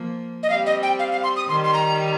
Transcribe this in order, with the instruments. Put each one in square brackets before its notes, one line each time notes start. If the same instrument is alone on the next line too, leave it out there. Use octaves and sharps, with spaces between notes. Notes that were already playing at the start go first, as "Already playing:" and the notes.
Already playing: [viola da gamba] F3 A#3
[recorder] D#5
[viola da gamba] G3 C4 [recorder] F5
[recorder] D#5
G5
F5
F5
C6
D#6
[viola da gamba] D#3 G3 [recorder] C6
[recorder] C6
A#5